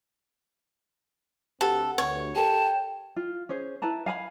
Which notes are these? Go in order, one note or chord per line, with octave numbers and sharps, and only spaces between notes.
D2 C4 G4 A4 B4 F#5
D2 C#5
G4 A4 A#4 G5 A5
F4
C#4 G#4 C5
E4 B4 A5 A#5
F5 G#5 A#5 B5